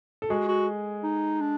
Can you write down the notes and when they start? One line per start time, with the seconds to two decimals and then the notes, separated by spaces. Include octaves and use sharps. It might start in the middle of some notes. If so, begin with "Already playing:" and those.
0.22 A4
0.30 G#3 F#4 G#4
0.48 F#4
1.03 D#4
1.41 D4